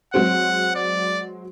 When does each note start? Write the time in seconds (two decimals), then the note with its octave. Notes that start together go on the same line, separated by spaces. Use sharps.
0.14 F#3 G#3 C4 F#5
0.75 D5